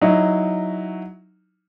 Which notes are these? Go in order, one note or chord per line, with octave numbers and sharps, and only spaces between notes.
F#3 D#4 E4